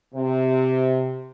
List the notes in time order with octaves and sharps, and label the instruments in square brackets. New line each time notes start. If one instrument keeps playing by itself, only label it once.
[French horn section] C3